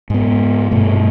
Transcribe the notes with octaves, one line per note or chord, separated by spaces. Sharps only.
G#2 B3
G2 B2 A3